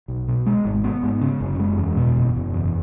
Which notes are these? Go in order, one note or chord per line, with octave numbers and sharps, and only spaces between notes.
B1
B2
G#3
G#1
B3
G#2
C#3
F#1
G#3
E2
B2
F#1
F#1
E2